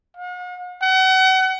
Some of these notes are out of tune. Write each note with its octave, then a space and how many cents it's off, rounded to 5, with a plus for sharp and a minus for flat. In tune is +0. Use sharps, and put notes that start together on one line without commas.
F#5 -45
F#5 +35